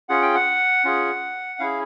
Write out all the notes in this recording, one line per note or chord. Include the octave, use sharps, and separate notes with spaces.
C#4 F4 G#4 F#5
G5
F#5
C#4 F4 G#4
C#4 E4 G#4 F5